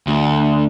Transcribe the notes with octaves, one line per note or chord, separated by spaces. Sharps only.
D2